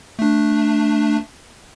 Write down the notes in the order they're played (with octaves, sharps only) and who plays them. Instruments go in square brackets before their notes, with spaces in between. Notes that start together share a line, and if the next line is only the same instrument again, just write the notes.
[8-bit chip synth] A3 D4